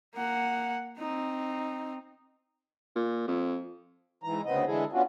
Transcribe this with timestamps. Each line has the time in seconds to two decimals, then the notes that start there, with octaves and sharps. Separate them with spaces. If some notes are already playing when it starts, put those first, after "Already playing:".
0.15 A#3 F#5
0.99 C4 D#4
2.95 A#2
3.28 F2
4.23 G#2 E3 A#5
4.45 D2 C#3 B3 C4 D#5
4.66 D3 E3 G#3 E4 G#4 A4
4.93 B3 C#4 D4 F4 F#4